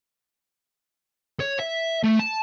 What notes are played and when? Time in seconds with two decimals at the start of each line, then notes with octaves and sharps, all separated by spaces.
1.40 C#5
1.59 E5
2.04 A3
2.20 A5